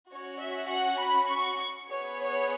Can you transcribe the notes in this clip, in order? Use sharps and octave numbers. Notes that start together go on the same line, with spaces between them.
C#4 F#4 C#5
E5
F#5
B5
C#6
B3 G#4 C#5
C#5